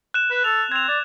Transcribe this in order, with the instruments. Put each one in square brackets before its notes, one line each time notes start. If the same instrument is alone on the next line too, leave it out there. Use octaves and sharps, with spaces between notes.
[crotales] F#6 E7
[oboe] B4
[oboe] A4 [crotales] F7
[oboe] C4 [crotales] G#6 F7
[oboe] D5